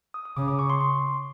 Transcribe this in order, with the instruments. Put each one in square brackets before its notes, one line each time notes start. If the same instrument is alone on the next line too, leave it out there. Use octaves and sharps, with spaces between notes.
[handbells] D#6
D#6
[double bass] C#3 [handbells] D6
[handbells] D6
C#6
C6
C6